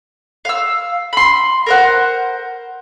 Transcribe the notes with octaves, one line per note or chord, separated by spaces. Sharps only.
F5 E6
B5 C6
A#4 C5 F#5